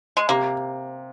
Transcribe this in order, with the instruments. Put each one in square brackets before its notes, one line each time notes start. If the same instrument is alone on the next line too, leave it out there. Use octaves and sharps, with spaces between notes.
[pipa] G#3
[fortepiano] C3 [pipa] A#3